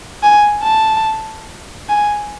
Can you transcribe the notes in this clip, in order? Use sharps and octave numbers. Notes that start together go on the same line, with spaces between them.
G#5
A5
G#5